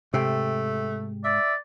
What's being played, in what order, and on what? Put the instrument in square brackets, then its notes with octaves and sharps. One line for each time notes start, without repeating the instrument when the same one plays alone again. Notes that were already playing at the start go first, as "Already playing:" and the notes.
[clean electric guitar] G#2 G5 [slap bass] C3 [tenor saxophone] A3
[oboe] D5 [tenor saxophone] E5